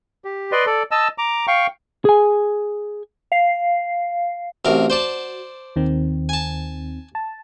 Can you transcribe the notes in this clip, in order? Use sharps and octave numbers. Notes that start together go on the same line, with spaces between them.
G4
B4 D5 D#5 C6
A4 D5
D#5 A5 E6
A#5 D6
F5 G5 C#6
G#4 G#5
F5 C7
A1 C3 F#4 A#4
C5 D5 A5
D#2 D#3 C4
G#5 A5
A5